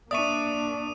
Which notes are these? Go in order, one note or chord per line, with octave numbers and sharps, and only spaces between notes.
A#3 D4 D5 E5 C#6 D#6 D#7